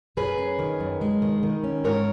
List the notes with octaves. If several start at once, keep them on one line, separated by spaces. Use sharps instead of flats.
F#2 G#4 B4
C#4
D#3
F#2
G#3
D#3
D#3
C#4
G#2 A#4 C#5